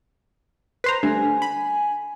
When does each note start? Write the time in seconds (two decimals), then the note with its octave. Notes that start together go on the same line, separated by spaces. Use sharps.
0.84 B4 C5 A#5 C6
1.03 D3 G3 A3 G#5
1.42 B5